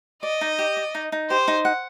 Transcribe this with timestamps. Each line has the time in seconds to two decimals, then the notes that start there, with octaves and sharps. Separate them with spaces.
0.23 D5 D#5
0.41 D#4
0.59 G4
0.77 D5
0.95 D#4
1.12 D#4
1.30 G4 C5
1.48 D#4
1.65 F#5